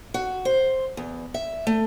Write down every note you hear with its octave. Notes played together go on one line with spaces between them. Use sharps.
F#4
C5
E2
E5
A3